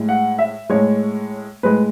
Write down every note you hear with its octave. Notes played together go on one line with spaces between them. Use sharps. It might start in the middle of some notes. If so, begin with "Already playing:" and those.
Already playing: A2 G#3
F#5
E5
A2 G#3 C#5
A2 G#3 B4